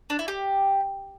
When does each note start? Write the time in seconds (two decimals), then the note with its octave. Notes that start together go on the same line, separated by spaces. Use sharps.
0.10 D4
0.19 E4
0.28 G4